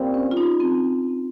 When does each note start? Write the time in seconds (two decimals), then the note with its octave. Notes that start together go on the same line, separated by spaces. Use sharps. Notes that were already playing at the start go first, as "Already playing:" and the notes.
Already playing: A#2 G3 C4
0.14 C#4
0.31 F4
0.37 D#4
0.60 C4